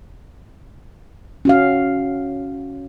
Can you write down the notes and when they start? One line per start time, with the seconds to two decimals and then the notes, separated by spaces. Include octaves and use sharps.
1.45 C#4 F#4 F5